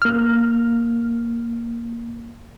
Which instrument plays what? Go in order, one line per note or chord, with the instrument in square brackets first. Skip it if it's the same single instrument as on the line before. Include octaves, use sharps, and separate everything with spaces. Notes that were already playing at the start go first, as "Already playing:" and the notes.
[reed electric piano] A#3 F6